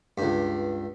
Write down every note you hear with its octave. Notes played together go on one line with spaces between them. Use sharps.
C#2 G2